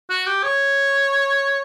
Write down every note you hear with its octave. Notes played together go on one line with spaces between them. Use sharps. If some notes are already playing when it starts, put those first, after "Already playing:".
F#4
G4
C#5